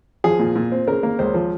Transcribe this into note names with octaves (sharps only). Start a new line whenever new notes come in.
F3 G#4
A#2
A#2
C4
C#3 A#4
A#3
C#2 C5
F3